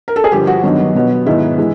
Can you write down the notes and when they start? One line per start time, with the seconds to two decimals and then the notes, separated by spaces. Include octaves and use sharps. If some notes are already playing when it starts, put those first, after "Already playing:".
0.08 A#4
0.16 A4
0.24 G#4
0.31 G2 D3 F3 G4
0.47 F#4
0.63 G2 D#3 F#3 B3
0.95 B2 F#3 B3
1.26 G#2 D#3 G#3 B3 E4
1.58 E3 G#3